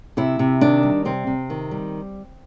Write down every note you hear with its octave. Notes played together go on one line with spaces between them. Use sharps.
C3 E4
C3
D#3 D4
G3
C3 C4
C3
D#3
G3